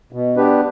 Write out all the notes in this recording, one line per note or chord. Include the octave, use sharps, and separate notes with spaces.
B2
B3 D4 G4 B4